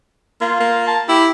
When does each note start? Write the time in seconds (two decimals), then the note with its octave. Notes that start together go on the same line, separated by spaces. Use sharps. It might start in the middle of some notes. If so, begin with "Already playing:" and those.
0.41 A#3 F4
0.60 A#3
0.87 A5
1.09 E4 G4